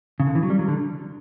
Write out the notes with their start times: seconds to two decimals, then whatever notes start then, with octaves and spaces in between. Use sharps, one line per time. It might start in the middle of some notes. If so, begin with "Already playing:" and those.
0.20 C#3
0.27 D3
0.35 E3
0.43 F#3
0.50 G3
0.59 F#3
0.68 D3